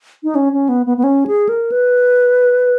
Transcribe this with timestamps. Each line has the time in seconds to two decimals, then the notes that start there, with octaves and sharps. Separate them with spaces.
0.23 D#4
0.35 C#4
0.53 C#4
0.69 B3
0.86 B3
0.97 B3
1.04 C#4
1.27 G#4
1.49 A#4
1.72 B4